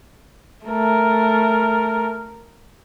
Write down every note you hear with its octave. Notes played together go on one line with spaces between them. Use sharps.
A3 A#4